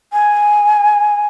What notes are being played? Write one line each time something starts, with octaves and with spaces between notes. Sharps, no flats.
G#5